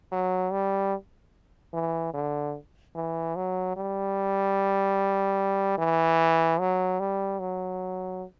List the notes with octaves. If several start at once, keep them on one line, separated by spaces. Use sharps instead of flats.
F#3
G3
E3
D3
E3
F#3
G3
E3
F#3
G3
F#3